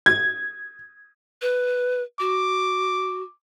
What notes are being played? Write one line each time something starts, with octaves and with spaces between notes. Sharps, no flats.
G#6
B4
F#4 D6